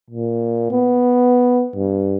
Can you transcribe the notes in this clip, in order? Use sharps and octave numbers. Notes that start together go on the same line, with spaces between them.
A#2
B3
G2